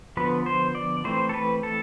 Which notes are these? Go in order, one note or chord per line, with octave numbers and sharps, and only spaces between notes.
D3 F3 B3 B4
C5
D5
E3 A3 C4 C5
A4
B4
A4